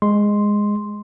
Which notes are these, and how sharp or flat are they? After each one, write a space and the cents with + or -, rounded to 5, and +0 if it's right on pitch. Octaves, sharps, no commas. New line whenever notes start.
G#3 -10 C6 +0